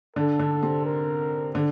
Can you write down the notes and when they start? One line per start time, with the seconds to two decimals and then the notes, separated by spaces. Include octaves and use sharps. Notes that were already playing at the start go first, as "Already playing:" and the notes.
0.16 D3 D4 A4
0.39 D3 D4
0.62 C3 C4
0.86 A#4
1.55 D3 D4